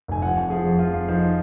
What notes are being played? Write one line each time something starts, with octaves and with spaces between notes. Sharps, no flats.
F1 G#5
F3 F#5
F2
F3 G#4
F2
F3 F4
F2
F3 D#4